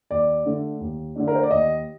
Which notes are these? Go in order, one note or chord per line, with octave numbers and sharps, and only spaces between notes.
D#2 D5
D3 A3 D4
D#2
D3 A3 D4
A#4
C5
D5
D#2 D#5